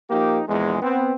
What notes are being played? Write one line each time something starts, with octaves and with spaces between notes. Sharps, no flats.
F3 A#3 D#4 G4
A#1 E2 G#3
B3 C4